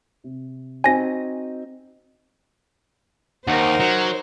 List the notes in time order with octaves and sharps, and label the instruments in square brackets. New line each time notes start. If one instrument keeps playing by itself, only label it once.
[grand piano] C3
[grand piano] C4 D#4 F#4 [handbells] G#5 A#6
[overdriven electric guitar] D#2 [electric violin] D#4 A#4 [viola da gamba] C5 [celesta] F#5
[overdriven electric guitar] F#3